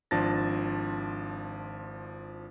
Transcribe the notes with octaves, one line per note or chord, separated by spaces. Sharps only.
G#1 F3 D4 A5 A6 A#6